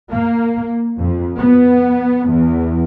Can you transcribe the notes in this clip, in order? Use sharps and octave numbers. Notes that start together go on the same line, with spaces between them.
A#3
F2
B3
E2